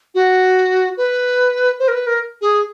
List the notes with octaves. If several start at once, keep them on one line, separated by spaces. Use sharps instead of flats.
F#4
B4
C5
A#4
B4
A#4
G#4